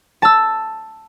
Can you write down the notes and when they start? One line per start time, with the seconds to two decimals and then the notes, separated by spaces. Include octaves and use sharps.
0.22 A5 E6